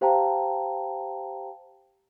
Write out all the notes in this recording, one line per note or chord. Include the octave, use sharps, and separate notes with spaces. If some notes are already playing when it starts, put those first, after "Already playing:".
G4 C5 F5 G5 A5 A#5